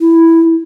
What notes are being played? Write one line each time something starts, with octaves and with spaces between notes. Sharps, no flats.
E4